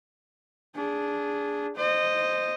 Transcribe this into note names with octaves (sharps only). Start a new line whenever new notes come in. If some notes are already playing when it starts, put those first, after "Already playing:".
D4 G#4
C5 D#5